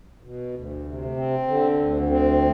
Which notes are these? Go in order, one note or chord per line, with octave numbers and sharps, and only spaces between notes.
B2
D2
C3
C4
D3
D2
C4